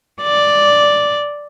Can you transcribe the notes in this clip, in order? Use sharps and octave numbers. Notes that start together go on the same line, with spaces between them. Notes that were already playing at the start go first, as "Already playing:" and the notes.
D5